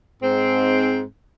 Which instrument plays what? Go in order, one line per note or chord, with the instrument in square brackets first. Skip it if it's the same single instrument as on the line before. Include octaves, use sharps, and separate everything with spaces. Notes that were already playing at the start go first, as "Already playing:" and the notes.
[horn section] G#2 C4